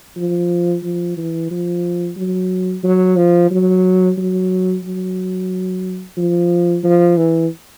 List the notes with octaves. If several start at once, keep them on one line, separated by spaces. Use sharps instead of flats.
F3
F3
E3
F3
F#3
F#3
F3
F#3
F#3
F#3
F3
F3
E3